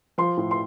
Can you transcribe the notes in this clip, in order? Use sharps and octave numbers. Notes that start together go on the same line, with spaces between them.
F3 C6
A2
C6